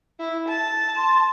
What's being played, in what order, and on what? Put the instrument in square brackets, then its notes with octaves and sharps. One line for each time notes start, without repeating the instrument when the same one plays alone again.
[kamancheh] E4
A5
[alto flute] C6